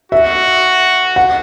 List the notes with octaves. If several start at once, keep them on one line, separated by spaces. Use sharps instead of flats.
F#4 E5
F#5